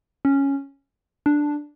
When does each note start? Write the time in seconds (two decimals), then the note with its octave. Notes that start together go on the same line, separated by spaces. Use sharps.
0.25 C#4
1.26 D4